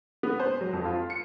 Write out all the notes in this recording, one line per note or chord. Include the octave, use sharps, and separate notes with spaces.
B3
C5
F#3
F2
F4
C#7